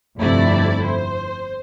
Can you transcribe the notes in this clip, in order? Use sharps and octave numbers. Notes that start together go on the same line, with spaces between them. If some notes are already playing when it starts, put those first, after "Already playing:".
G1 F2 C3 A3 E4 D5
C5